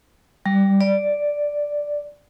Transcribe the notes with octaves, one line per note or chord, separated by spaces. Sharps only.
G3
D5